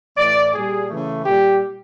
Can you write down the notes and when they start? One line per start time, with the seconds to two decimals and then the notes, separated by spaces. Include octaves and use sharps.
0.17 A2 E3 A3 D5
0.54 A#2 G3 G#4
0.89 C#3 E3 A3
1.25 A#2 G3 G4